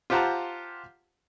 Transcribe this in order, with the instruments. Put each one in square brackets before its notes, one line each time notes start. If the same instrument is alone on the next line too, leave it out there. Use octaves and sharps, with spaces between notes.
[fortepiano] F4 G4 C5 F#5 A5 A#5